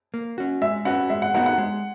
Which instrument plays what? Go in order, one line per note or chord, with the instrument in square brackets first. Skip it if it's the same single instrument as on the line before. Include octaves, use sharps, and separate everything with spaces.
[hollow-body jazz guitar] A#3
C#4 F#4
[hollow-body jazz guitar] G#3 [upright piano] E5
[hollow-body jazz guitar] C#4 F#4 B4 [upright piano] F#5
[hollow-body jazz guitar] G#3 [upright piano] E5
[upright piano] F#5
[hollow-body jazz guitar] B3 D#4 F#4 A#4 [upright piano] F#5
[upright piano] F#5
[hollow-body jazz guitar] G#3